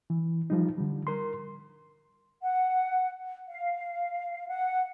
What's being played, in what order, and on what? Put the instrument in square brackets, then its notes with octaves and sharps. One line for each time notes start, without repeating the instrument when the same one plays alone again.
[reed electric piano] E3
F3 G3 D#4
D3 G3
A#4 C6
[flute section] F#5
F5
F#5